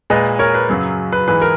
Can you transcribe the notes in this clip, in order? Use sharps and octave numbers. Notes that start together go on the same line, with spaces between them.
A#2 G#3 B4 D#5
A#4 C#5
B4
F#2 C#3 F#3
B4
G#2 E3 G#3 B4
A#4